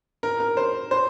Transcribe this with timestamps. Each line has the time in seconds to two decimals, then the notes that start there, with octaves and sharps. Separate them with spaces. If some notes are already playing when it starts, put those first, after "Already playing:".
0.23 A#4
0.40 A#4
0.57 C5
0.91 C5